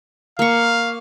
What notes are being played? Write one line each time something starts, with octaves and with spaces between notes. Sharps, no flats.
A#3 F5 C#6